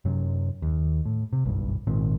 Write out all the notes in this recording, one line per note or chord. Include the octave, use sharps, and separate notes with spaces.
F#2 C3 F#3
D#2
A2
C3
F#1 B1 G2
G#1 A#2 D#3 C4